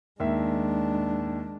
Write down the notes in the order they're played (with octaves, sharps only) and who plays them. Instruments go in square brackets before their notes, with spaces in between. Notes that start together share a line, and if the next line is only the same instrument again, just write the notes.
[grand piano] D#2 E5 [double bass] G#3 D4